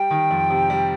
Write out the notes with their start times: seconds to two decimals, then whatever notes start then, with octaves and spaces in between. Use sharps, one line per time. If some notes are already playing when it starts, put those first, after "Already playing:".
Already playing: G3 G5
0.11 D#3
0.31 F2
0.50 C3
0.70 G3